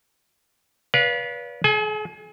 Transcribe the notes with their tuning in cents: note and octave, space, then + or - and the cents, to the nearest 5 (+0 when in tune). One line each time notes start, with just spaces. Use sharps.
B4 -25 D5 -45 F5 +0
G#4 +45 G#5 +0